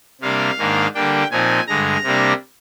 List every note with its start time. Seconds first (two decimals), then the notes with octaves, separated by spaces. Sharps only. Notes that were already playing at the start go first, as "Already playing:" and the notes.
0.21 C3 G3 A#3 D4 F5
0.58 G#2 D#3 A#3 D4
0.95 D3 G3 A#3 D4 G5
1.31 A#2 F3 C4 D#4 G#5
1.67 G2 D3 G#3 A#5
2.04 C3 G3 A#3 D4